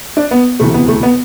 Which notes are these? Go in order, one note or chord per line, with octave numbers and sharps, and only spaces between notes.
D4
B3
E1 D2 C3 E3 A3
B3
A3
B3